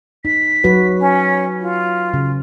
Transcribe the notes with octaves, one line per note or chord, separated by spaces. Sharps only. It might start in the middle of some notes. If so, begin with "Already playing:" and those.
D#4 B6
F#3 F#4 B4
C#4
F4
C#3